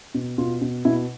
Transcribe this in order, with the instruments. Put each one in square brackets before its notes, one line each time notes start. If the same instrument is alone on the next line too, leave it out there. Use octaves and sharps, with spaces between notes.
[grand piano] B2
B2 F4
B2
B2 E4